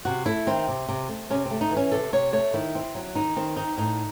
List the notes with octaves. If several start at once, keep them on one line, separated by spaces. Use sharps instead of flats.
C3 F#4
A3 E4
D#3 C4
C3
C3
A3
C3 C#4
C4
A3
D#4
E3
C#4
C3 A4
C3 C#5
A3 C#5
D#3 E4
C4
F#3
D#3 D#4
D#3 C4
C4 D#4
A2 D#4